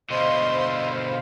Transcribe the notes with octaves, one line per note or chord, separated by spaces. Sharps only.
B2 D3 C5 D#5 F5 B5 C6